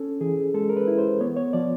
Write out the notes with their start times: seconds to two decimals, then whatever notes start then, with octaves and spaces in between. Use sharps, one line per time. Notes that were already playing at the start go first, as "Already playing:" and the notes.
Already playing: C#4 A4
0.21 E3 G#4
0.54 G#3 A4
0.69 A#4
0.77 B4
0.87 E4
0.98 C5
1.21 B3 C#5
1.36 C#5
1.53 F3 D5